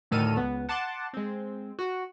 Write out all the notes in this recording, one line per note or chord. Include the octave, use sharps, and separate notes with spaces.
D2 A2 D#3 A4 F6 D#7
C#2 B3
F#5 A5 C6 D6
G#3 C4
F#4